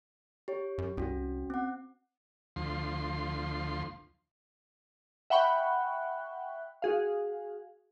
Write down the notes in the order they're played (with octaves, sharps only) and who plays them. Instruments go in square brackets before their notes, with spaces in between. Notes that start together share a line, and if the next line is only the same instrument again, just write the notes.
[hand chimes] G4 C#5
[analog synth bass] F#2
[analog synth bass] C2 [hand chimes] C#4 F#4
[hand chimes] C4 F#5
[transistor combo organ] D2 F3 C6
[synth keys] E5 F#5 G5 B5 C#6 F#6
F#4 G#4 F5